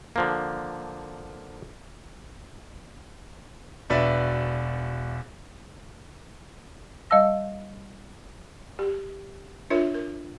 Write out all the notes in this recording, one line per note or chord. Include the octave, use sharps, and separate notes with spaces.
D3 F3 A#3
E1 D4 F#4 B4 D5 E5
G3 D#5 F5 A5 E6 A#6
G4
D4 F4 A#4 C#5 E5
A#4